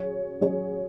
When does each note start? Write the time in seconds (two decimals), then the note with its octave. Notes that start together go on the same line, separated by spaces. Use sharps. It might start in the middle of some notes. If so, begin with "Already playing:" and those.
Already playing: F#3 C#4 G#4 C#5
0.41 F#3 C#4 G#4 C#5